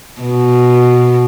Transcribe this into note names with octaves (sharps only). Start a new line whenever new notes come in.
B2